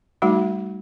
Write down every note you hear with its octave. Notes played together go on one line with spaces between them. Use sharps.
G3 A3 D#4 F#4